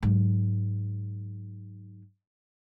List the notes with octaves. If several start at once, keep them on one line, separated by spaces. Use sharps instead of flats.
G#2 F#3